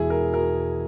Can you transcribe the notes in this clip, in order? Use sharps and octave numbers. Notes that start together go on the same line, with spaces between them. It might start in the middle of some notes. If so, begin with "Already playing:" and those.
Already playing: E1 E2 B2 E4 G#4
A#4
B2 A#4